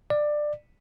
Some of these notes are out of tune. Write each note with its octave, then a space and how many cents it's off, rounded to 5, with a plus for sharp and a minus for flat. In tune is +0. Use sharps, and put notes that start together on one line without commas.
D5 +20